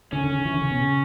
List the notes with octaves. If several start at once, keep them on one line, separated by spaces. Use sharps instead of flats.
D3 C#4
D3
C#3
E3
D3
C#3
B2
C#3